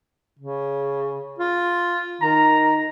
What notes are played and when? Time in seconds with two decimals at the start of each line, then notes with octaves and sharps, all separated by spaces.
0.39 C#3
1.39 F4
2.22 D#3 A#5